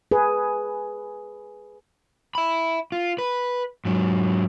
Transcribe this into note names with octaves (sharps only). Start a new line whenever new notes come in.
G#4 B4
E5 B5
F4
B4
G#2 F#3